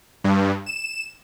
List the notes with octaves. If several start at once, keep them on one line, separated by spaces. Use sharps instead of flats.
G2
E7